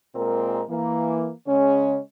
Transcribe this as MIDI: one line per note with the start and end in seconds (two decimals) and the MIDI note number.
0.15 0.62 46
0.15 0.62 56
0.15 0.62 60
0.15 0.62 70
0.70 1.32 52
0.70 1.32 58
1.47 2.00 49
1.47 2.00 56
1.47 2.00 61